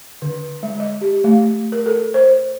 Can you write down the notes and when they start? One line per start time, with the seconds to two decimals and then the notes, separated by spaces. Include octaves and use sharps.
0.22 D3
0.63 G#3
0.80 D#5
1.01 G4
1.24 A3
1.72 A#4
1.86 A4
2.14 C5